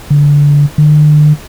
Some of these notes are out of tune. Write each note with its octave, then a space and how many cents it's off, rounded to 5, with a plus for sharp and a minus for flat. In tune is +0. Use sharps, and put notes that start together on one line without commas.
D3 -20
D3 +40